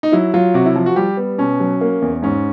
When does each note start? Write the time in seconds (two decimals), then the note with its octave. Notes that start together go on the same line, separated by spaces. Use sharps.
0.03 D#4
0.12 F#3 E4
0.34 F#3 F4
0.54 C3 F#4
0.66 E4
0.75 F3
0.86 F#4
0.96 G3 G4
1.17 B3
1.38 B2 C#4
1.60 F#3
1.81 A#3
2.02 E2
2.23 G#2 C#4